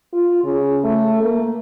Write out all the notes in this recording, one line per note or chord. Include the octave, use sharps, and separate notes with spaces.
F4
C#3
A3
A#3